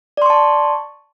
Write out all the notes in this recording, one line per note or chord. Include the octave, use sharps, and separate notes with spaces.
D5 A5 C6 C#6